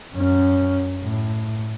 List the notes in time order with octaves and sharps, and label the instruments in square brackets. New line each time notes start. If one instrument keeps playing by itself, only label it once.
[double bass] F#2 C#4
A2